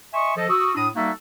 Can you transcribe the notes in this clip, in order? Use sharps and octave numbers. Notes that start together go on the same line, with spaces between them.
D#5 E5 G#5 C6 C#6
F3 A4 D#5
F#4 D#6 E6
A2 D4 E4 D#6
G3 A#3 D#4 F#4 A4 E5